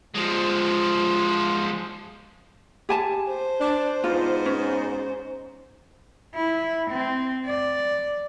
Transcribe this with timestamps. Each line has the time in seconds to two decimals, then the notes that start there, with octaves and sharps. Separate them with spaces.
0.15 F3 G#3
2.89 G4 G#5 A5
3.29 C5
3.61 D4
4.04 G#2 B2 B3 F4
4.46 C#4
6.35 E4
6.91 C4
7.46 D5